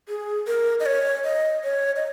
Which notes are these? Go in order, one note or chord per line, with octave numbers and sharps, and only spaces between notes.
G#4
A#4
D#5
C#5
D#5
C#5
D#5